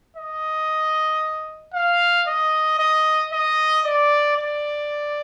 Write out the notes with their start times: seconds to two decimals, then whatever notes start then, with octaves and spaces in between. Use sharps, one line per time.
0.16 D#5
1.74 F5
2.27 D#5
2.79 D#5
3.32 D#5
3.85 D5
4.37 D5